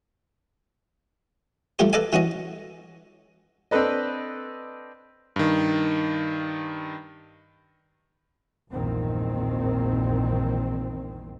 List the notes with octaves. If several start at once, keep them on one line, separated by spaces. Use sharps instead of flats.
F3 G3 A3 G4 C5
A4 B4 D5 D#5 F5 G#5
E3 C#4 F#4 D#5
C4 D4 A4 B4 D#5
G2 D#3
A#1 E2 G2 A#2 D#3 C4